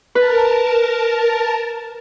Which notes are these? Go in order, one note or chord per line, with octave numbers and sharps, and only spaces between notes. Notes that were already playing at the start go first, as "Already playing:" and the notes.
A#4 B4 A5